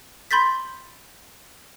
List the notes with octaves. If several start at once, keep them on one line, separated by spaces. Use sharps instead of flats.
B5 C6 G6 A6 B6